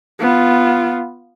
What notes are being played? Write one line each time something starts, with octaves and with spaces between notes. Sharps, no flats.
B3 F4